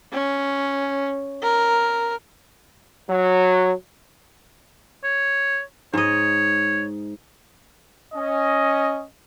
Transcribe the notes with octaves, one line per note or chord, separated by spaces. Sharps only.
C#4
A#4
F#3
C#5
G#2 C#5 D#5
C#4 D#5